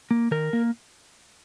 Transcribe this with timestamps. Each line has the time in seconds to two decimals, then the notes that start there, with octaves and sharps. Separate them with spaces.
0.11 A#3
0.31 D#3 A#4
0.53 A#3